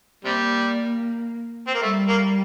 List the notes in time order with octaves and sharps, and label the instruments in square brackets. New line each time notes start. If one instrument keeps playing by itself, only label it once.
[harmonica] C3 G3 [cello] A#3
[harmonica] C4
A#3
[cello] G3 [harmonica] A3
[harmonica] A#3